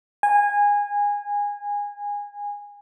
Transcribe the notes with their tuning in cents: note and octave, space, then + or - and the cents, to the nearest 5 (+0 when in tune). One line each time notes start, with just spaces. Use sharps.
G#5 -20